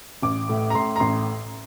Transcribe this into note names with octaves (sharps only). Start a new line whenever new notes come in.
A1 D6
A2
A#5
A2 C6
A#5
A1 C6